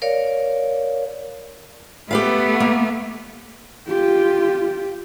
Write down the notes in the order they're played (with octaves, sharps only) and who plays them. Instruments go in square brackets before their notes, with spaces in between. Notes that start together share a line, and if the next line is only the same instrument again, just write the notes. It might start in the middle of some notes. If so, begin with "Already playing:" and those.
[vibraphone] A#4 C#5 D5 F5
[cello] A3 B3 [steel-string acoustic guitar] G4 B4 F5
[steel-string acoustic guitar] A#3
[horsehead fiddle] F4 G4